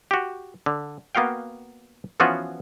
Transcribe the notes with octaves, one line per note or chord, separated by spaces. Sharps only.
F#4 G4
D3
A#3 B3 F#4 F5 G5
E3 F3 B3 C#4 F4 F#4